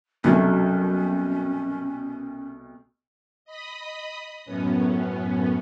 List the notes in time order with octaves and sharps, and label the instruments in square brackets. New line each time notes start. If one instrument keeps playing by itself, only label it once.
[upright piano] C2 B2 A3 [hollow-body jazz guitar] F#2 F#3 [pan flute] C#4
[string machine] D#5 B5 D#6
F#2 A2 B3 C#4